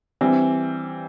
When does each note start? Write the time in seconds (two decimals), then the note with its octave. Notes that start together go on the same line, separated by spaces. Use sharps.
0.21 E3 G3 C4